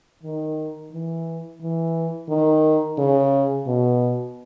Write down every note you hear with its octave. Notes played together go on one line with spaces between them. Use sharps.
D#3
E3
E3
D#3
C#3
B2